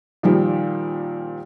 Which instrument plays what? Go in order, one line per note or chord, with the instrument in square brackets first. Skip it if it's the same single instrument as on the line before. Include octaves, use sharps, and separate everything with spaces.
[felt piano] A#2 D#3 F3 G3